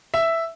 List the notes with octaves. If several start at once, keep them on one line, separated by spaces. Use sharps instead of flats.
E5